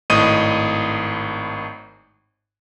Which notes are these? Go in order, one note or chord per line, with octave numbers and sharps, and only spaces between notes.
G#1 A2 D#5 D#6 D#7